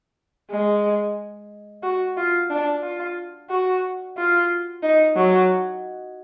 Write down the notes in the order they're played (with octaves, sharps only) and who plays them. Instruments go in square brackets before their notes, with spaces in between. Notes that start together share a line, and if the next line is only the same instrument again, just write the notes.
[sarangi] G#3
F#4
F4
D4
F4
F#4
F4
D#4
F#3